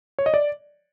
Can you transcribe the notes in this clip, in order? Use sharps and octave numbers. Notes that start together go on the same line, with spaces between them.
C#5
D#5
D5